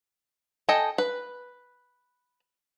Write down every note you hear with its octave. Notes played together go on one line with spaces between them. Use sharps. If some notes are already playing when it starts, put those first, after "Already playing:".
A4 D#5 G5 G#5
B4